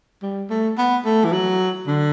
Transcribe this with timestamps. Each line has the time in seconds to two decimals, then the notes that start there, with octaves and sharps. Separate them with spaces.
0.23 G3
0.50 A3
0.78 B3
1.05 A3
1.25 E3
1.32 F#3
1.87 D3